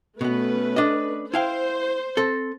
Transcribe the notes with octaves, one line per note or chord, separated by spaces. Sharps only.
B2 A3 B3 C#4 B4
D4 D#5
E4 C5 F5 G5
C4 A4